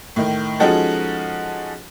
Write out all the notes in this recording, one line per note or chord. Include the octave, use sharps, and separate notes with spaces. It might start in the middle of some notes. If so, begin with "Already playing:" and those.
A2 D#3
F3 G#3 C#4 D#4 F#4 A4